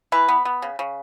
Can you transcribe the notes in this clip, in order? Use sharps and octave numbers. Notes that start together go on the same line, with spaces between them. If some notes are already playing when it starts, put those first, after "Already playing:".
E3 B4
B3
B3
C#3
C#3